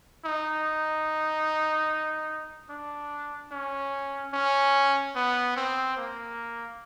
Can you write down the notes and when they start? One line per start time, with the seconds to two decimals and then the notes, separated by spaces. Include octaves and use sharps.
0.25 D#4
2.69 D4
3.52 C#4
4.33 C#4
5.15 B3
5.56 C4
5.97 A#3